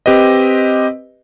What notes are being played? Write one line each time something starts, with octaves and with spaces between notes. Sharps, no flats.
C4 G4 B4 D#5